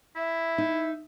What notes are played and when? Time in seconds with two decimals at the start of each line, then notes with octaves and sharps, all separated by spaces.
0.16 E4 E5
0.58 D#4